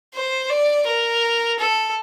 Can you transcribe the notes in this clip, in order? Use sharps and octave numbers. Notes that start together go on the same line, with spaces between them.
C5
D5
A#4
A4